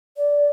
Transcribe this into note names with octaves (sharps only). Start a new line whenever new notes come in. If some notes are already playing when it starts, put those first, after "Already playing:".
D5